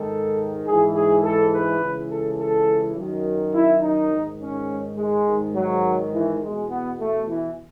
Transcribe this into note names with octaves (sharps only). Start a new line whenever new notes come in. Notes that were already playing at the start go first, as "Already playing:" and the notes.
Already playing: G#2 D#3 A4
G#2 E3 G#4
G#4
A4
B4
C#2 C#3 E3
A4
A4
F#2 D#3
E4
D#4
G#2 D#3
C#4
G#3
G#2 D#3
F#3
E3
E2 B2 G#3
B3
A3
E3